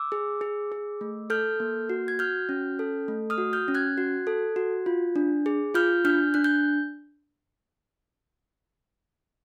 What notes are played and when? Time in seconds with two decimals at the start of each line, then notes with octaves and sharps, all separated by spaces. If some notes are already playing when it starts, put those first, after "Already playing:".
Already playing: D6 E6
0.12 G#4
0.41 G#4
0.72 G#4
1.01 A3
1.30 A4 F6 G6
1.60 A#3
1.89 F#4
2.08 G#6
2.19 F#4 F6 G6
2.49 C#4
2.79 A4
3.08 A3
3.30 D#6 F6
3.38 F#4
3.53 F6 G6
3.68 C#4
3.75 F#6 G#6
3.98 F#4
4.27 A4
4.56 F#4
4.86 F4
5.16 D4
5.46 G#4
5.74 F4 F6 G6
6.05 D4 F6 G6
6.34 D4 F#6
6.44 G6